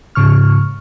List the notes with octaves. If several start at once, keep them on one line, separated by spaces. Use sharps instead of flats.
G#2 C#3 C#6 F6